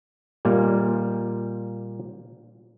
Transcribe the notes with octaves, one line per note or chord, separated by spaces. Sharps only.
A#2 G3 A#3